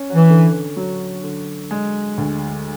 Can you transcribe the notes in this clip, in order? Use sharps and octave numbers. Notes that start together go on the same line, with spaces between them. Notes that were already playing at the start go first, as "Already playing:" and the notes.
Already playing: C#4
F#3
E3
D3
F#3
D3
G#3
D2